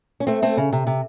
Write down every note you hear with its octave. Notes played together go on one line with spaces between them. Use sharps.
C#4
A3 C4
A3 C4
C#3
C3
C3